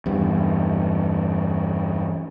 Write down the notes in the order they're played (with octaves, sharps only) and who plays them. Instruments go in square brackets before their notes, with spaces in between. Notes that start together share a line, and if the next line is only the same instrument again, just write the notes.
[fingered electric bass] E2 G2